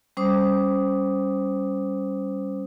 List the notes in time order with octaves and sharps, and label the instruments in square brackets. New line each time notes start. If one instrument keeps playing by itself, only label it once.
[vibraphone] G3 C#4 C5 D6 D#6